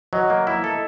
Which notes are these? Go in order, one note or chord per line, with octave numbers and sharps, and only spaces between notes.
F#3 D#5
A#3
E4 E5
A4